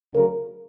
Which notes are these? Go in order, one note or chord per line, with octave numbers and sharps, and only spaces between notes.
D2 C#3 F#3 A#4